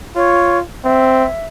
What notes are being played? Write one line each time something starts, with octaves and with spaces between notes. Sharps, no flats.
F4 C#5
C4 E5